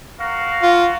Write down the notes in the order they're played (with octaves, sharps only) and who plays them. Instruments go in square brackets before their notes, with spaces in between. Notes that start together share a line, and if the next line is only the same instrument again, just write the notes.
[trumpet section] F#4 A#4 F5
[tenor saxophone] F4